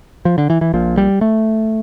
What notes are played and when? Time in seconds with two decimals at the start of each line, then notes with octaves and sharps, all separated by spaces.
0.25 F3
0.38 D3
0.50 E3
0.61 E3
0.73 A#1 A#2 F3
0.97 G3
1.21 A3